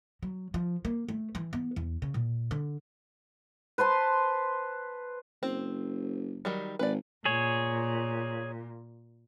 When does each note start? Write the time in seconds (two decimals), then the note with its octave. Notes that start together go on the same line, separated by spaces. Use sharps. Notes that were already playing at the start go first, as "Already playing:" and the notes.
0.23 F#3
0.54 F3
0.85 A#3
1.08 A3
1.35 E3
1.53 B3
1.76 E2
2.02 C#3
2.14 A#2
2.51 D3
3.78 B4 C5 A5 C6
5.43 F#1 C4
6.45 D#3 F#3 G3
6.79 G#1 B4 D5
7.25 A#2 G#4 C#5